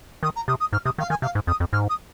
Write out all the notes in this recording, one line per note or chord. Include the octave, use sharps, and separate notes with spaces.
D#3 D#6
A#5
C3 D#6
D#6
G#2 F6
C3 D#6
D#3 F5
D#3 G#5
C3 F5
G#2
F2 D#6
F2
G#2 F6
D#6